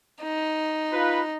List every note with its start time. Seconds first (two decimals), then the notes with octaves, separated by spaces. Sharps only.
0.23 D#4
0.93 F4 B4